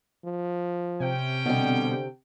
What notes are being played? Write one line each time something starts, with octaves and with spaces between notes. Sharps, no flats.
F3
C3 C#4 G5
B2 D3 G3